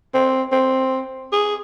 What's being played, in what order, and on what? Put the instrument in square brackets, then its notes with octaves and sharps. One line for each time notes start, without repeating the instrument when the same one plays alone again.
[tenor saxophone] C4
C4
G#4